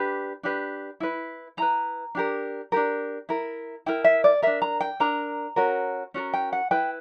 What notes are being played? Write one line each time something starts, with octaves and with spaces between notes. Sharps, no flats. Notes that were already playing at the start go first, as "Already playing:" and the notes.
Already playing: D4 G4 B4
D4 G4 B4
E4 B4
E4 B4 A#5
D4 G4 A#4
D4 G4 A#4
E4 A#4
E4 A#4 G5
E5
D5
D4 A#4 E5
A#5
G5
D4 A#4 A#5
C#4 F#4 A#4
C#4 F#4 A#4
G5
F#5
E4 B4 G5